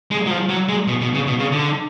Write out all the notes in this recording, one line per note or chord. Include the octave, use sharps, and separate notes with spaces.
G#3
F#3
F3
F#3
G#3
B2
B2
C#3
B2
C#3
D3